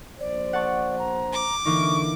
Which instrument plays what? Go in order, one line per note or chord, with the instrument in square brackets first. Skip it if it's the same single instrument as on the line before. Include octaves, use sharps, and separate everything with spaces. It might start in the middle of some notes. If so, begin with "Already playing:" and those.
[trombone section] A#1 C5 [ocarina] D5
[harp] F#5 A5 C#6
[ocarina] A#5
[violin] D6
[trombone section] D3 [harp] E3 A#3 D#4 [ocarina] C#6